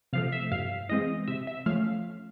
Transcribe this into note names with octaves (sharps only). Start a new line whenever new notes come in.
C3 F3 A3 F5
E5
G2 F5
E3 G#3 C4 D#5
C3 E5
E5
F3 A3 C#4 F5